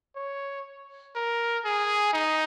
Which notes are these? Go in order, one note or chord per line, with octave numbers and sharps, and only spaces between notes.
C#5
A#4
G#4
D#4